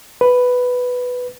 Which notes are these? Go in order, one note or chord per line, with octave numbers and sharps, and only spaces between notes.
B4